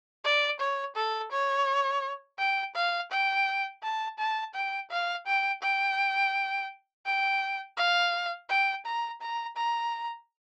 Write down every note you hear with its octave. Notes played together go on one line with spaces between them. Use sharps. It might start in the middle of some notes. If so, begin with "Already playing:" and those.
D5
C#5
A4
C#5
G5
F5
G5
A5
A5
G5
F5
G5
G5
G5
F5
G5
A#5
A#5
A#5